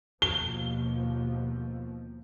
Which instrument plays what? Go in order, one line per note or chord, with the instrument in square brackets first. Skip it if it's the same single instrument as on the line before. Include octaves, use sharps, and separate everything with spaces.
[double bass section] D#2 B2 F3 [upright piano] G7